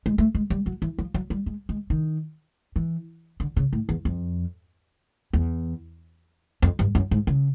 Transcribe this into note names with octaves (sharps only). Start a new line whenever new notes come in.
G#3
A3
G#3
G3
F#3
E3
F3
F#3
G3
G#3
G#3
D#3
E3
D3
C#3
A2
E2
F2
E2
F2
G2
F#2
G#2
C#3